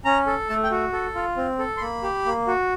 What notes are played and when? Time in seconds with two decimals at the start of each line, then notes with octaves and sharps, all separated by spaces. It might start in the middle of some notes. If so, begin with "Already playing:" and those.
0.05 C#4 A#5
0.27 A4
0.49 A3 A5
0.64 G5
0.71 F#4
0.93 A4
1.15 F4
1.37 C4
1.59 A4
1.77 C6
1.81 A#3 B5
2.03 G4
2.25 A#3
2.47 F#4